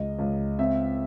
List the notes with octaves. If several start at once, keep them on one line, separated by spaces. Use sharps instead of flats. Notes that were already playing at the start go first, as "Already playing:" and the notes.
Already playing: C#2 D#5
C#2
C4 E5